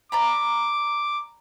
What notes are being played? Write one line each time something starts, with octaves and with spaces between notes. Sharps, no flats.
D5 A#5 B5 D6